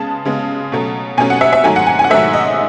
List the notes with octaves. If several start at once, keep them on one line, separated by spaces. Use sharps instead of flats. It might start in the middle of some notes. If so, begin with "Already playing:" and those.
Already playing: C#3 G#3 B3 A5
C#3 G#3 B3
B2 F#3 A3 C#4
B2 F#3 A3 C#4 G#5
F#5
E5
E5
G#2 D#3 F#3 A3 G#5
F#5
G#5
G#5
F#5
G#2 D#3 F#3 A3 E5
D#5